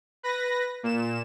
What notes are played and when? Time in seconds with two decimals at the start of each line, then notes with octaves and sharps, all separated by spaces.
0.23 B4 A#6
0.83 A#2 E7